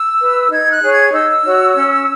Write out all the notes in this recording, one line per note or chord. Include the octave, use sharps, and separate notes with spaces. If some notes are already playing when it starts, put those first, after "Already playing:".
Already playing: E6
B4
D#4 G#6
F#6
G#4 C#5
G#6
D#4 E6
F#4 C#5
C#4